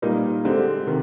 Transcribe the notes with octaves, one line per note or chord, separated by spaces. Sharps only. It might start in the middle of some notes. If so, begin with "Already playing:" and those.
A#2 G3 A#3 D#4
D3 G#3 C4 G4
C3 D#3